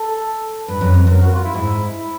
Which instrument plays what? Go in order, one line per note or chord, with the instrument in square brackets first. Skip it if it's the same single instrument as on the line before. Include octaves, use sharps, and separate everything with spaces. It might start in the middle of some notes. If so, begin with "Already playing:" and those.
Already playing: [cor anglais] A4
[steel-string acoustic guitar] G2 [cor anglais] B4
[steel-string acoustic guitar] F#2
F2
[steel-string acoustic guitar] F#2 [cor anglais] A#4
[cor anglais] F#4
F4
E4
[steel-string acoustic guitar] G#2 [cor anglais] E4
[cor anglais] E4